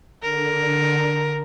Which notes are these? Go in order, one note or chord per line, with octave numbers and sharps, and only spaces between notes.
D3 A#4